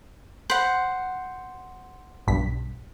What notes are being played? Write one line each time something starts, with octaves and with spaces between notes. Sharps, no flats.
C5 F#5 B5 F#6
B1 G2 B6